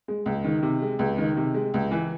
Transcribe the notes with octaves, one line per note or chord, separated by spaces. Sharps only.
G#3
C#2
D#3
C3
G#3
C#2
D#3
C3
G#3
C#2
E3